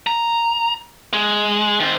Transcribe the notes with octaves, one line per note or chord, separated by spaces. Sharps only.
A#5
G#3
D#3 C5